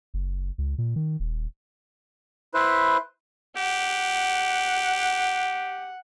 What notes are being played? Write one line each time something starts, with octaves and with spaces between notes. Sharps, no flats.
F#1
C#2
A#2
D#3
D#1
E4 B4 C5
G4 F#5